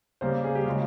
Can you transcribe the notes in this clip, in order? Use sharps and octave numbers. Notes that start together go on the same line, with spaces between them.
C#3 G3 A#3 C5
G#4
G4
C#3 G#3 F4